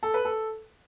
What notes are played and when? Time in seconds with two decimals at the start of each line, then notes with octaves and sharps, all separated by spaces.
0.03 A4
0.14 B4
0.25 A4